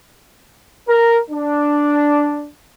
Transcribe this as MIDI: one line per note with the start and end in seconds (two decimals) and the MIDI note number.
0.88 1.19 70
1.31 2.48 62